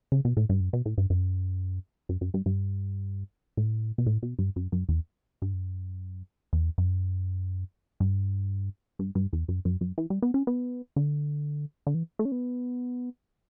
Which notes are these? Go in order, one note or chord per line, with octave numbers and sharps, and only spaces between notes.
C#3
B2
A2
G2
F#2
B2
A2
G2
F#2
F#2
F#2
G2
G2
A2
B2
A2
B2
G2
F#2
F#2
E2
G2
F#2
E2
F#2
G2
G2
G2
E2
F#2
F#2
F#2
E3
G3
B3
C#4
B3
D3
D3
E3
A3
C#4
B3